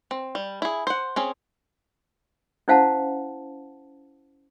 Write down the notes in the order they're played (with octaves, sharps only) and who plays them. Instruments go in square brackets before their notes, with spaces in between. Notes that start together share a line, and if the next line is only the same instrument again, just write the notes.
[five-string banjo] C4
G3
E4 G#4
C5 F#5
C4 C#4 G#4
[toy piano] C#4 E4 C5 F5 F#5 A5